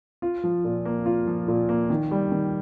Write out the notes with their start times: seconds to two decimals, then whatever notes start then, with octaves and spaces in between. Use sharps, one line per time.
0.22 F4
0.44 F3
0.64 A#2
0.85 A#3
1.06 F4
1.27 F3
1.48 A#2
1.69 A#3
1.90 D#3
2.11 G3
2.32 D#3